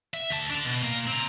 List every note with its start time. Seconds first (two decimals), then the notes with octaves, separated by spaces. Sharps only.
0.14 E5
0.30 D2 A5
0.50 D4 A4
0.65 B2
0.83 A#2 A#3
1.07 C4 A#5